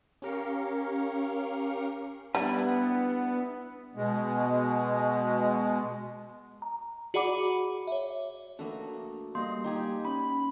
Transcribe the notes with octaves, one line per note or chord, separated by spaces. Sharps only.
C#4 G4 A#4 F5 C#7
G3 B3 D4 E4 B4
B2 G#3
A#5
F#4 G#4 D5 F#5 B5 D6
C#5 E5
A3 A#3 D4 F#4 B4
G3 A#3 D5 D#5 C6
D#4 G4 G#5
C#4 B5